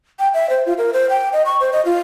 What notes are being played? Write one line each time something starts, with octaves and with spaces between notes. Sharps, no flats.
G5
E5
C5
F4
A#4
C5
G5
D#5
C#6
C5
D#5
F4